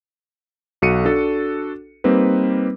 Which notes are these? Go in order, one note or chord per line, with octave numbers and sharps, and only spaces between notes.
B1 F#4 A4 C#7 D#7
D4 F#4 A4
G3 A#3 C4 D#4 B4